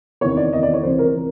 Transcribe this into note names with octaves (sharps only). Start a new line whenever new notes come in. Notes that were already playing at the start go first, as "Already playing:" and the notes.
E2 C3 D#3 C#5
D5
E2 C3 D#3 D#5
D5
C#5
C#2 C3 E3 C5
A#4
C3 E3